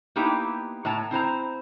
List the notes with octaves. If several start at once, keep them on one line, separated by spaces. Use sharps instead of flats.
A#3 B3 D#4 E4 G4
A2 C#5 A5 A#5
C4 E4 C5 A#5